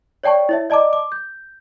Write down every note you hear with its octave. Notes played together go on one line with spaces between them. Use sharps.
C#5 D5 G5 A5 C#6
E4 C#5 E5
D5 D#5 A5 A#5 D6
D6
G6